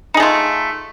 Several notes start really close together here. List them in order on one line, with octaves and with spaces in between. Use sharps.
D#4 G#4 A3 F4